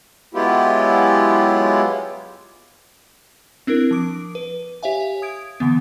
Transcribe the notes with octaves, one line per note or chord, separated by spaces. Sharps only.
F#3 G#3 B3 E4 F4 G4
C4 D4 E4 A#4
F3 D6 D7
B4
G4 C#5 E5 F5 G#5
D#6 G#6 D7
D3 E3 B3